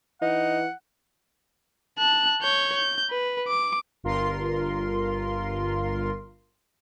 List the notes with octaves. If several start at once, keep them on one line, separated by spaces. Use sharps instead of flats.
E3 D#4 F#5
A5 F#6
C#5 G6
G6
B4
D6
G1 G2 F4 A#4 C6